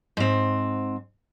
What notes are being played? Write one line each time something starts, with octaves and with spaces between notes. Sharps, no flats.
G#2 C4